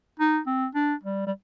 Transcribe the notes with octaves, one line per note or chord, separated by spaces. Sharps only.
D#4
C4
D4
G3
G3